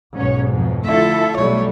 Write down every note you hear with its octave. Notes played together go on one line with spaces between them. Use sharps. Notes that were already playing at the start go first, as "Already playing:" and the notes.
B1 G#2 C#4 C#5
F2 F3
D3 A3 E4 F4 A4 E5
B1 F#3 G3 A3 C#5